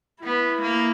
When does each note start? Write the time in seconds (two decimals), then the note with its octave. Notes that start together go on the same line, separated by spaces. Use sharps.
0.23 B3 E4
0.62 A#3